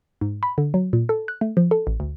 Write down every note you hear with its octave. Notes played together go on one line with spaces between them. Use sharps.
G#2
B5
D3
F#3
A#2
A4
F#6
A3
F3
A4
A1
D2